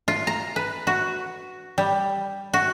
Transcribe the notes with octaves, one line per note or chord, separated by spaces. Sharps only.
F4
A#5
B4
F#4
G3
F#4